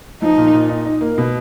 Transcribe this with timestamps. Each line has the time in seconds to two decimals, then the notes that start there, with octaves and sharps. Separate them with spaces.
0.22 F3 D#4
0.38 A#2
0.53 A#2
0.69 D#4
0.85 D#4
1.01 A#3
1.18 B2